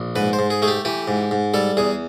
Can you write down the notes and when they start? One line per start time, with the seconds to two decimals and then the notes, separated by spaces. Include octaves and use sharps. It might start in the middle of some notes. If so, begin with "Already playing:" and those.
Already playing: A#1
0.16 G#2 B4
0.33 C5
0.39 G#2
0.50 G#4
0.62 A3 G#4
0.68 G4
0.85 E3 G4
1.08 G#2
1.31 G#2
1.54 G3 A4
1.77 E2 G#4